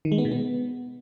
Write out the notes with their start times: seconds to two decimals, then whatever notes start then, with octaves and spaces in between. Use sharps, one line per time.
0.05 D#3
0.12 G#3
0.18 B3
0.25 B2
0.32 B3